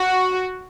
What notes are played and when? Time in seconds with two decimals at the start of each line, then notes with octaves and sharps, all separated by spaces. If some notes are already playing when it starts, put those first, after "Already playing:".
Already playing: F#4